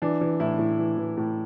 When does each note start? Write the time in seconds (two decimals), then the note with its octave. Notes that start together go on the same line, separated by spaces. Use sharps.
0.02 E3 D4
0.21 E3
0.40 A2 E4
0.59 A2
0.79 E3
0.97 E3
1.17 A2